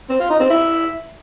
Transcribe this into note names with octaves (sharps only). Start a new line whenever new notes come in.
C4
F4
D#4
C4
E4